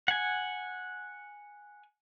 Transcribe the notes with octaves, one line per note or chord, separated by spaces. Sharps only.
F#5 G#5